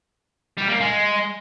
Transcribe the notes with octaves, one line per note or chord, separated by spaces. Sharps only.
G3
A#3
G#3